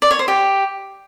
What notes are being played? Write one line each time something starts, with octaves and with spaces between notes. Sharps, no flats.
D5
C#5
C5
G4